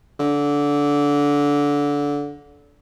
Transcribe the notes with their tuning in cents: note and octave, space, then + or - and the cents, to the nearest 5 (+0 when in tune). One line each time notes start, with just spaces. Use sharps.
D3 -20